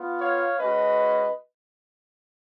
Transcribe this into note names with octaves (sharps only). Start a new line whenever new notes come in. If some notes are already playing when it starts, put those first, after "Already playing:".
Already playing: B3 F4
C#5 F5
G#3 C#4 F#4 B4 D#5